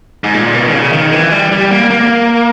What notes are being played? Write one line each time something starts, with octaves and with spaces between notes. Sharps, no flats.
G#2
A#2
B2
D#3
C#3
D#3
E3
G3
G3
A#3
A#3